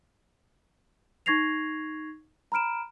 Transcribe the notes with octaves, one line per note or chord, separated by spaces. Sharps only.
D#4 C#6 G#6 A#6 C7 F7
A#5 B5 F6 D7 E7